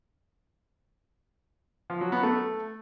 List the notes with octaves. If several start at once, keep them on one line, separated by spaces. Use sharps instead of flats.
F3
F#3
B3
A3